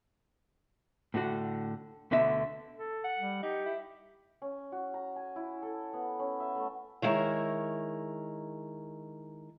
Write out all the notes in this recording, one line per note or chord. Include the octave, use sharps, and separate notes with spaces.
A2 D3 F#4
D2 B2 D3 E5
A4
F#5
G3
D#4 G4
E4
C#4
F#4
A#5
G#5
E4
A4
B3
C#4
E5
A3
D#3 G#3 E4 A#4 C#5